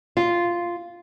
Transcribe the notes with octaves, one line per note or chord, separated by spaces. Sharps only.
F4